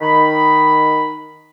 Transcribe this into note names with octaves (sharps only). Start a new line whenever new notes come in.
D#3 B5